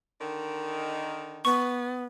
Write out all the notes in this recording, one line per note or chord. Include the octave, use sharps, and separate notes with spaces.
D3 D#3
B3 C#6